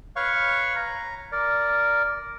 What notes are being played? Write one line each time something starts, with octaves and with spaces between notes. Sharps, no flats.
B4 C#5 F5 C#6
A#5
A#4 D5